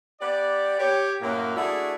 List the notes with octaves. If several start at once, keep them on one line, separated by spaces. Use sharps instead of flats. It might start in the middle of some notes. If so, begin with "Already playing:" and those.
B3 G4 D5
G4 C#5
F#2 A2 F#3 A#3
A3 D4 E4 F#4 G#4